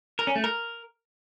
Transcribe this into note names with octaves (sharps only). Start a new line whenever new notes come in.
A#4
C#4
A3
A#4